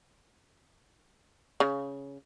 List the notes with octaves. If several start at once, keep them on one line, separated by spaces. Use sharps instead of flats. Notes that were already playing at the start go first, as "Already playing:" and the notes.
C#3